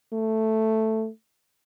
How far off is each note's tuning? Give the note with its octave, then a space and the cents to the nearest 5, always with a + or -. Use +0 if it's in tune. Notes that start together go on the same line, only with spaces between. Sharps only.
A3 +5